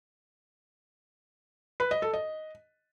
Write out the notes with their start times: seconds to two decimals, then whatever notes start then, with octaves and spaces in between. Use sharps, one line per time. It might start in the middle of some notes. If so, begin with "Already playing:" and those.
1.80 B4
1.91 D#5
2.02 A4
2.13 D#5